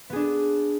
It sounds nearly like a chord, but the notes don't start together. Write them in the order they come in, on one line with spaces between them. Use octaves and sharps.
B3 G#4 D4